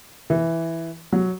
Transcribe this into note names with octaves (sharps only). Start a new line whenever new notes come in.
E3
F#3